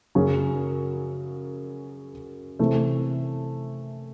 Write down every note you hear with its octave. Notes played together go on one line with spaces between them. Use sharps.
F#2 C#3 F#3 C#4 G#4
C3 E3 A3